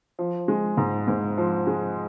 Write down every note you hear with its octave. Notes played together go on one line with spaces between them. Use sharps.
F3
G#3
G#2
G#2
F3
G#3